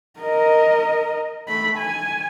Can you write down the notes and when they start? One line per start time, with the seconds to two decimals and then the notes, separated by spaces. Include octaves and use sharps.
0.20 A#4 D#5
1.48 A3 B5
1.78 G#5